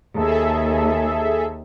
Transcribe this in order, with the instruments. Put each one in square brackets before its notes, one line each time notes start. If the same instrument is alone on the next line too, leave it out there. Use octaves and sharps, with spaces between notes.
[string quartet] D#2 [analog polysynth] G#4 A4 E5